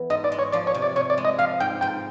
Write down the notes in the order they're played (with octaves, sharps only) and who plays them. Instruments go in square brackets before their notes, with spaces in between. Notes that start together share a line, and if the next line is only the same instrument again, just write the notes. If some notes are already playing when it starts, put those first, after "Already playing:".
Already playing: [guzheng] E3 B3
[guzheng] G#2 [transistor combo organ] D#5
[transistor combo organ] D5
[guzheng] G#3
[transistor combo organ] C#5
[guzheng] F3 [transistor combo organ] D5
[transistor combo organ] C#5
[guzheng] C3
[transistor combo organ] D5
[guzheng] C3 [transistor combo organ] C#5
[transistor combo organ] D5
[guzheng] G#3
[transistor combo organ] D#5
[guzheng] F3 [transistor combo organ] F5
[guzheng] G#2 [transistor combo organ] G5
[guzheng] G#2 [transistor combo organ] G5